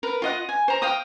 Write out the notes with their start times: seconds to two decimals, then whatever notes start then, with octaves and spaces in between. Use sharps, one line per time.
0.03 A#4 B4
0.22 F4 D#5 F#5
0.49 G#5
0.68 C5 A#5
0.82 F5 G5 D#6